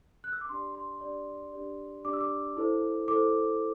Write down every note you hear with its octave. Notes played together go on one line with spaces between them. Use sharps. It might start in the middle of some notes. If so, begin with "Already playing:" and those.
F#6
E6
D6
D4 G4 D5 C6
C6
D4 G4 D5
D4 G4 D5
D4 G4 D5 D6
E6
D6
E4 A4 C5
E4 A4 C5 D6